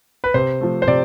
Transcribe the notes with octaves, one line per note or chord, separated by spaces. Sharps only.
B4
C3 C5
F3 A3
C5
C3 D5